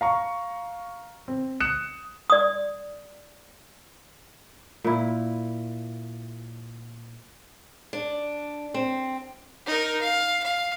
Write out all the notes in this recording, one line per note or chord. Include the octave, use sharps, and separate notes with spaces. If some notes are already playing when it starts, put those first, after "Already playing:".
F5 A#5 C#6
C4
D#6 F#6 C#7 E7
D5 D#6
A#2 E4
D4
C4
D#4 A#4
F5
F5